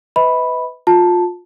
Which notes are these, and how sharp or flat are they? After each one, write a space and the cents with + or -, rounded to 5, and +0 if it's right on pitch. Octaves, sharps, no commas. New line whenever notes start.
B4 +20 D#5 +45 B5 +0
F4 +25 A5 +0